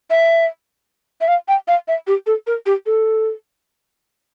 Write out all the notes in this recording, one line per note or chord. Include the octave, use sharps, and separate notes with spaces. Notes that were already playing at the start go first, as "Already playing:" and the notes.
E5
E5
F5
G5
F5
E5
G4
A4
A#4
G4
A4